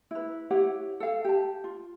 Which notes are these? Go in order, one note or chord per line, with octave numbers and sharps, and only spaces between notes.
E4 B4
E4 G4 C#5 F#5
A4 F5
G4 A5
F4